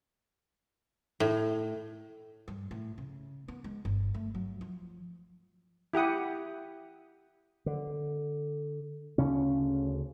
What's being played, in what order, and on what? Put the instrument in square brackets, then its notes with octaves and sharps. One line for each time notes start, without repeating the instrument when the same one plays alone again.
[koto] A2
[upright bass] G2
A2
C#3
B3
G#3
G1
A3
F#3
F3
[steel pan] E4 G4 F#5 D#6
[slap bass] D3
D2 C#3 C#4